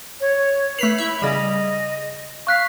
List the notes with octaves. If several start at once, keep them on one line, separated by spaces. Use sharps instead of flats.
C#5
A3 B4 B6 C7 F7 F#7
E4 E5
C#3 G3 D#5
F5 C#6 F#6 B6